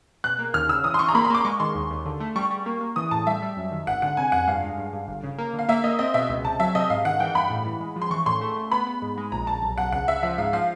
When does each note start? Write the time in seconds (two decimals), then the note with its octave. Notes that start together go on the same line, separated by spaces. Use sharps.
0.24 B2 F#6
0.39 A#3
0.54 D#2 F6
0.69 C#3 E6
0.84 E3 D#6
0.94 C6
0.99 E3 C#6
1.09 A#5
1.15 A#3 B5
1.25 C6
1.30 A#3 D6
1.45 G#3 C#6
1.60 D#3 C6
1.75 D#2
1.90 D#2
2.05 D3
2.20 A3
2.36 G3 C#6
2.50 G3
2.66 A#3
2.81 A#3
2.96 E3 D#6
3.11 A2 A5
3.26 G3 E5
3.42 G3
3.57 F#2
3.72 D#3
3.87 G#1 F#5
4.02 D3 F#5
4.17 C3 G#5
4.32 F2 F#5
4.47 G2 F5
4.63 G#3
4.78 G2
4.93 G2
5.08 G1
5.24 C#3
5.38 A#3
5.53 D3
5.59 F5
5.68 A#3 E5
5.84 A#3 D#5
5.99 C4 D#5
6.14 B2 E5
6.29 C#2
6.45 C3 A5
6.60 F#3 E5
6.75 C3 D#5
6.90 G#2 F5
7.05 D#3 F#5
7.20 E3 G5
7.35 G2 B5
7.50 A2
7.66 E3
7.80 G#3
7.96 F3
8.02 C6
8.11 E3 C#6
8.26 A2 C6
8.41 A3
8.56 A3
8.71 B3 B5
8.87 B3
9.02 G#2
9.18 G#3
9.32 A#1 A#5
9.47 A#1 A5
9.63 B1
9.78 B1 F#5
9.92 C#2 F#5
10.08 C#2 E5
10.23 F3 E5
10.38 G#2 F5
10.53 F3 F5